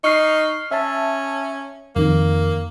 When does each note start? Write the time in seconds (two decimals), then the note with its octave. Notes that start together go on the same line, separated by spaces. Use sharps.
0.04 D#4 C#6 F6 C7
0.71 C#4 E5 A5
1.96 F2 D#3 A#3